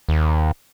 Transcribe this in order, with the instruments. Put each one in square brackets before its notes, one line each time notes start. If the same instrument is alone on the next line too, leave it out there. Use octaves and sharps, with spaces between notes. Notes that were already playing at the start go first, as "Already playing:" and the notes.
[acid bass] D#2